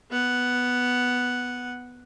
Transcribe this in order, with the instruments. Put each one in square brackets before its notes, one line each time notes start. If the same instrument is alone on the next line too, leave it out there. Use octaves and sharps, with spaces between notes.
[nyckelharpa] B3 F#5